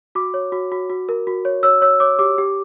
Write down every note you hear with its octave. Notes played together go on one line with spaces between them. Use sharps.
F#4 D6
C#5
F#4
F#4
F#4
A#4
F#4
C#5
C#5 E6
C#5 E6
C#5 D6
G4 D6
G4